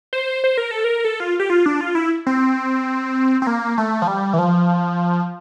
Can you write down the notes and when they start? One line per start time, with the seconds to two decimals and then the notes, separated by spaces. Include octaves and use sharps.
0.13 C5
0.44 C5
0.58 A#4
0.71 A4
0.84 A#4
1.05 A4
1.20 F4
1.40 G4
1.50 F4
1.66 D4
1.81 F4
1.95 E4
2.26 C4
3.42 C4
3.47 A#3
3.78 A3
4.02 F3
4.08 G3
4.33 E3
4.39 F3